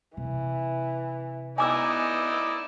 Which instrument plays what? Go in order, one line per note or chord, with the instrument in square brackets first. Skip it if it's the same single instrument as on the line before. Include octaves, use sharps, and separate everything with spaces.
[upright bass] C3 [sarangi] E3
[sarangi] B3 [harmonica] D#4 E4 D5 [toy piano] G#5 D6 E6